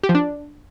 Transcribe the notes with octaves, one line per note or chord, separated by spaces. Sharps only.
G4
F3
D4